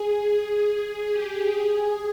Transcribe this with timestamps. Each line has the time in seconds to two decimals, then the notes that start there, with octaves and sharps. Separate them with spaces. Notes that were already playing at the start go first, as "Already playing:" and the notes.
Already playing: G#4
1.10 G4
1.53 G#4